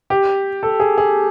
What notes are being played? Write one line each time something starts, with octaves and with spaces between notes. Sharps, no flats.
G4
A4
G#4
G#4